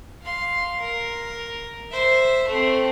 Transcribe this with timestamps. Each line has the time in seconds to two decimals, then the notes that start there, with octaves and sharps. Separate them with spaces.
0.22 F5 C6
0.80 A#4
1.91 C5 E5
2.48 A3 C4